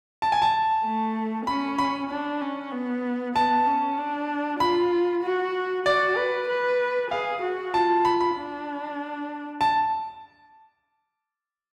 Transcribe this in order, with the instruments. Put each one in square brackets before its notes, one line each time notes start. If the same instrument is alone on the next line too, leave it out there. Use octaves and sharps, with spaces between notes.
[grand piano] A5
G#5
A5
[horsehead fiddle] A3
[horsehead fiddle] C#4 [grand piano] B5
[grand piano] B5
[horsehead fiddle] D4
C#4
B3
[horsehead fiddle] B3 [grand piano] A5
[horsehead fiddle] C#4
D4
[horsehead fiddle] F4 [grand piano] B5
[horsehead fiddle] F#4
[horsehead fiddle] F#4 [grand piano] D5
[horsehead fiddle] B4
B4
[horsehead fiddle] G#4 [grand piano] F5
[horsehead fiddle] F#4
[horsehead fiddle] F4 [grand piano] A5
[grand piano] B5
B5
[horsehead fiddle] D4
[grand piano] A5